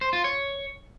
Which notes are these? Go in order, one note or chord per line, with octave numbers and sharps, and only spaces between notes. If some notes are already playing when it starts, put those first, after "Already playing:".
C5
F4
C#5